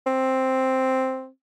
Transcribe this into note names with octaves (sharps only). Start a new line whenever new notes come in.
C4